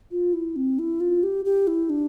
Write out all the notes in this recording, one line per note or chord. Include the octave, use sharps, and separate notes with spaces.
F4
E4
C4
E4
F4
G4
G4
E4
D4